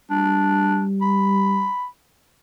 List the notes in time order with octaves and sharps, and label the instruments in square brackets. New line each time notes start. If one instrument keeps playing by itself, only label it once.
[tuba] G3 [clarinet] D4
[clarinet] B5